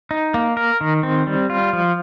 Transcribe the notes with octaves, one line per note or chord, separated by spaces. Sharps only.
D#4
A#3
A#4
D#3
C4
G3
F4
F3